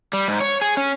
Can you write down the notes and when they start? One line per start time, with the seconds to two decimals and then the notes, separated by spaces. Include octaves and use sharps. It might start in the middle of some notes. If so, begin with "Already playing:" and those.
0.13 G3
0.28 G#2
0.41 C#5
0.61 G#4
0.77 C#4